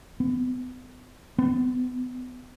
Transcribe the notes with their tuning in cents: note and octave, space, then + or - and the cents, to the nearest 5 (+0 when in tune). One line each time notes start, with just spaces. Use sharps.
B3 +35
B3 +30